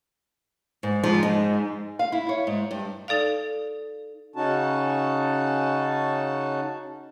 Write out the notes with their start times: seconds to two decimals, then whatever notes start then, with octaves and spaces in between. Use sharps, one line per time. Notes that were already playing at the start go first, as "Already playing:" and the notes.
0.83 G#2
1.04 G#2 F3
1.23 D#4
1.99 F5
2.12 E4
2.29 C#5
2.47 G#2
2.71 G2
3.08 D#4 A4 D5 F5
4.36 C#3 C#4 D#4 F#4 A5